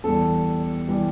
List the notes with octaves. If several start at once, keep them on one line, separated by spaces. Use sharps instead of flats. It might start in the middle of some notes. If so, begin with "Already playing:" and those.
E2 E3 G3 A4
E3 G3